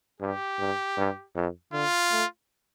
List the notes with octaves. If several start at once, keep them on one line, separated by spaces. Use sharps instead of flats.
G2 G4
G2
G2
F2
D3 F4
A3